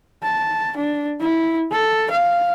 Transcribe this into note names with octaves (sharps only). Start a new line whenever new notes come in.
A5
D4
E4
A4
F5